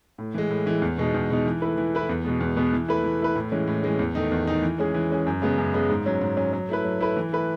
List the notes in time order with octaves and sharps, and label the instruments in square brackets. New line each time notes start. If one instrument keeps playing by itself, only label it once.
[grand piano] A2
E3 G#3
A2
E3 G#3
E2
B2 G#3 D#4
E2
B2 G#3 D#4
E3
A3 E4 B4
E3
A3 E4 B4
E2
B2 G#3 B3
E2
B2 G#3 B3
E3
A3 E4 B4
E3
A3 E4 B4
A2
E3 G#3 C#4
A2
E3 G#3 C#4
E2
D#3 A3 D#4
E2
D#3 A3 D#4
E3
G#3 C#4 G#4
E3
G#3 C#4 G#4
F#2
C#3 G#3 B3
F#2
C#3 G#3 B3
G#2
F#3 C#4
G#2
F#3 C#4
F#3
A3 E4 B4
F#3
A3 E4 B4
E3
A3 E4 B4